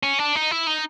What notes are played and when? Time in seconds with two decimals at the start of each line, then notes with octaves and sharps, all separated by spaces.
0.03 C#4
0.19 D4
0.36 D#4
0.51 E4
0.67 D#4